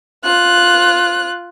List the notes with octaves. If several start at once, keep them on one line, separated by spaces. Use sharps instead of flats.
F4 F#6